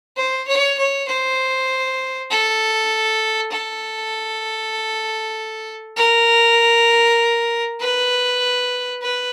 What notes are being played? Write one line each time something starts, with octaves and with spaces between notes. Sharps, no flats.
C5
C#5
C#5
C5
A4
A4
A#4
B4
B4